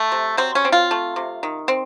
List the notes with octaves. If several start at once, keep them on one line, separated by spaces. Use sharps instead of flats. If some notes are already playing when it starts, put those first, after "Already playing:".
Already playing: A3
C3
F#3 C4
C#4
C4
F4
A3
C3
D#3
C4